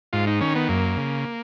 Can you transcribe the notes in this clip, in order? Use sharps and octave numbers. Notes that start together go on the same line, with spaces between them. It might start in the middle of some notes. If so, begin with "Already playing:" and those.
G#2 F4
D#4
D#3 C#4
B3
F#2 A#3
C#3